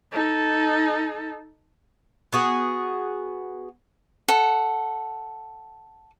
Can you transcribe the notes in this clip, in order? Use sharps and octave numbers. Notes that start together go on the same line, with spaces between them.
D#4 A4
B3 F#4 G#4
A4 F#5